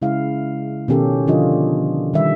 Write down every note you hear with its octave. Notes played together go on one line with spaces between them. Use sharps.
C#3 G#3 E4 F5
B2 D#3 C#4 G4 A4
D3 F3 D4 F4 D#5
D#3 G3 E5